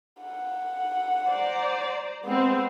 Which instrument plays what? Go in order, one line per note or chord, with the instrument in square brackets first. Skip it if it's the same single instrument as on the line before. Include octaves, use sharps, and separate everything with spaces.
[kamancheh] F#5
[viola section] C5 D5 A#5
[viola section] G#3 C4 C5 [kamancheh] B3